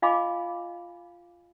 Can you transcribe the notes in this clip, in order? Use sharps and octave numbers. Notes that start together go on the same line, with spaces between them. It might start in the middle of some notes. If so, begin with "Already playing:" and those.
F4 D#5 F5 G#5 B5 D6